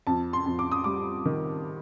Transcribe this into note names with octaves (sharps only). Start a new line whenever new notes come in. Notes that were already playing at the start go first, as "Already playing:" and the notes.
F2 A5
C6
F2
D6
D#6
G3 D6
D#3